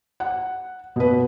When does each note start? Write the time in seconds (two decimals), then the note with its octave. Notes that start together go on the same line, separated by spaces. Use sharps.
0.20 F#5
0.96 B2 B4